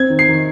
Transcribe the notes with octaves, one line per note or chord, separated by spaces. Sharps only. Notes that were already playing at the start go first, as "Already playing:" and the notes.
Already playing: C4 G#6
D#3
C7
D#3